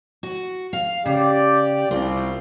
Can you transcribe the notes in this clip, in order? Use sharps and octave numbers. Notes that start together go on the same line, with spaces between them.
F#4
F5
C#3 G4 D5
C2 C4 F4